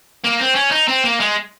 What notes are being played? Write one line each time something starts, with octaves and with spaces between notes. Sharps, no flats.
A#3
C4
C#4
D#4
C4
A#3
G#3